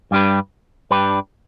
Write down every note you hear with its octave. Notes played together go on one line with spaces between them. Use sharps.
G2 G3 D4 G4 B4
G2 G3 D4 G4 B4